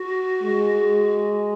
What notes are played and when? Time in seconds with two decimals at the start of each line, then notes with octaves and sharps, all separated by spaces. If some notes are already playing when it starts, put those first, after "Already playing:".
Already playing: F#4
0.43 G#3